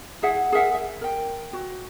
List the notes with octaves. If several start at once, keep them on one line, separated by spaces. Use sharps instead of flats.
E4 G#4 E5 F#5
G#4 A#4 E5 F#5
E5
A#4 G5
F#4